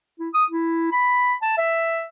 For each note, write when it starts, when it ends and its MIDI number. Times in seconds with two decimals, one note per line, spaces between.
0.19 0.29 64
0.34 0.45 87
0.50 0.90 64
0.92 1.35 83
1.42 1.54 81
1.58 2.09 76